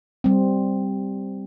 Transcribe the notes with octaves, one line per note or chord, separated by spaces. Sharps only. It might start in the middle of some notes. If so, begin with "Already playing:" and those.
G3 C4